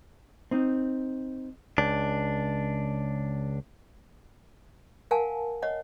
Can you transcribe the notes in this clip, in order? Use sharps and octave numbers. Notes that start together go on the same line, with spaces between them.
C4 D#4
C#2 D4
A#4 F5 F#5 G#5 A5
C#5 D#5 F#5